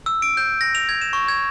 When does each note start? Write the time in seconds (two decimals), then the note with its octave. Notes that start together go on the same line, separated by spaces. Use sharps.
0.06 E6
0.22 D7
0.37 G6
0.61 A#6
0.75 F7
0.89 G#6
1.01 E7
1.13 C#6
1.28 G#6